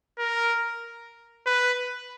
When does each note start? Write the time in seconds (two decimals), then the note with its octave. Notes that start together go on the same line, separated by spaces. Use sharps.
0.18 A#4
1.47 B4